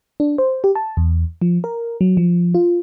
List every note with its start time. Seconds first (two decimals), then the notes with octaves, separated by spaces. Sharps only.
0.20 D4
0.38 C5
0.64 G4
0.75 A5
0.97 E2
1.42 F3
1.64 A#4
2.01 F#3
2.17 F3
2.54 F4